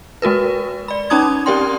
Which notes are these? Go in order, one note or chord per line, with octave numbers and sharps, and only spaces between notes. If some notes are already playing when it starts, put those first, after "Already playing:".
G#3 F#4 A#4 B4
D5 B5
C#4 D#4 A#5 D#6 G#6
C4 G4 A#4 D5 G5 C6